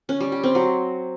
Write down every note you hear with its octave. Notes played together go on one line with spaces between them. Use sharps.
C#4
G3
G4
C4
F#3